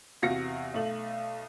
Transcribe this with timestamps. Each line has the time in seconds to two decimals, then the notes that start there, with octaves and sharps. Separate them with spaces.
0.22 E2 C3 F#4 F5 A#6 C#7
0.74 B1 A3 F#7